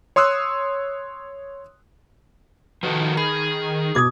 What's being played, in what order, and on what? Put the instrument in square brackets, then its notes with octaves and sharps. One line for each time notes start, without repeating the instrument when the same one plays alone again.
[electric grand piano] C#5 C6 D#6 E6 F#6
[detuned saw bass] D#3 [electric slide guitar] F3 F#4 A4 [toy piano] B4
[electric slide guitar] G#4 [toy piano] B5
[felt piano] B2 G#6 [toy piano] D6 D#6